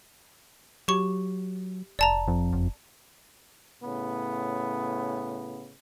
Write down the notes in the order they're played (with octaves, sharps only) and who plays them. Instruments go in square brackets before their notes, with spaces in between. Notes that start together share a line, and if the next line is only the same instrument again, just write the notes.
[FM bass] F#3 [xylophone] G4 C#6
[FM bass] F1 [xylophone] D5 A5 A#5
[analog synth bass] F2
[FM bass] F#1
[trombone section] A2 C#3 B3